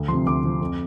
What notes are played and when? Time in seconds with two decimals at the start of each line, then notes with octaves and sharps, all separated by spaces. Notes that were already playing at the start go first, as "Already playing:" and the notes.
Already playing: D2
0.08 C3 F3 C6
0.26 D2 D6
0.44 C3 F3
0.61 F2